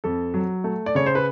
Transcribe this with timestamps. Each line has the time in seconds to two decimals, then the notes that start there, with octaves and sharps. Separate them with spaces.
0.04 F2 A4
0.34 F#3
0.64 A3
0.86 D5
0.95 C#3 C#5
1.06 C5
1.15 B4